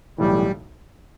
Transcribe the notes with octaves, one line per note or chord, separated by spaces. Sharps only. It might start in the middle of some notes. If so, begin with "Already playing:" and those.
B1 A2 E3 G3